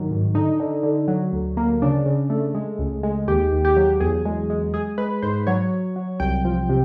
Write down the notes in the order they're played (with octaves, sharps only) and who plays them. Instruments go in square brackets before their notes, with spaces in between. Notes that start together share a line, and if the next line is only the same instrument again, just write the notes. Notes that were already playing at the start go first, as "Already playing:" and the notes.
Already playing: [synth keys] G2 D#3 F#3
G#2
D3 D#4
D3
D3
F#3
D2
A#3
C#3 D4
C#3
A3
G#3
C#2
G#3
D#2 G4
D#2
G4
F#3
E2 G#4
G#3
G#3
G#3 G#4
G#3 B4
G#2 C5
F#3 C#5
F#3
F#3
C2 G5
F3
C3